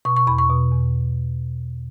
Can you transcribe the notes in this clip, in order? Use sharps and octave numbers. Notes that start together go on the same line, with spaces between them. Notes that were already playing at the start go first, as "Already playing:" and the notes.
B2 C#6
C#6
E2 B5
C#6
B2
E2